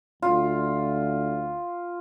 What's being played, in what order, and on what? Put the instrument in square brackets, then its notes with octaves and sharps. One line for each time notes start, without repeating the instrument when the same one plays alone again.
[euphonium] D2 [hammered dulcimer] F4